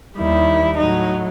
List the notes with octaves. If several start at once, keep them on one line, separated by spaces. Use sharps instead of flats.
D#2 D#3 G3 E4
A2 F#3 D#4